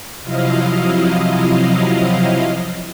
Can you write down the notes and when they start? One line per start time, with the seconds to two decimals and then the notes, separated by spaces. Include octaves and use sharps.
0.23 C3 F3 F#3 E4 D#5 F5